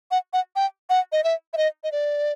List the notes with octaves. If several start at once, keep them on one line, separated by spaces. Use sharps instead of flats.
F#5
F#5
G5
F#5
D#5
E5
E5
D#5
D#5
D5